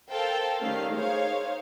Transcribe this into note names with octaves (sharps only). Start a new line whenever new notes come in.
A4 A#4 C5 F5 G5 A5
D#3 G3 A3 C#4 F5
D#4 G#4 A#4 C5 C#5 F5